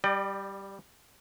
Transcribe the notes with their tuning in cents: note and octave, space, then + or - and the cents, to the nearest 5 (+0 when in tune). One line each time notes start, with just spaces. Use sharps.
G3 +0 D5 +35 G5 +0